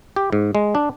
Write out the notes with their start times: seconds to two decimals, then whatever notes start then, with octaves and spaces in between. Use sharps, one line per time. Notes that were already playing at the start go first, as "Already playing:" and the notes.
0.16 G4
0.32 G#2
0.55 G#3
0.75 D4